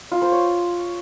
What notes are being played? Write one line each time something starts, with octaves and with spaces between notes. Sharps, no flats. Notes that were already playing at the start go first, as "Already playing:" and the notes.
F4
C5
C#5